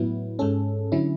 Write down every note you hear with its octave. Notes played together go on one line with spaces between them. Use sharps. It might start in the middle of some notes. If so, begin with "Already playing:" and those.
Already playing: A2 F#3 B3 E4
G#2 G#3 C#4 A4
D3 F#3 C#4 E4